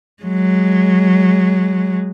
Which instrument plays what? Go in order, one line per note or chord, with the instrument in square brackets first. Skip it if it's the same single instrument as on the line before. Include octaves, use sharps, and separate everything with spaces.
[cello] F#3 G#3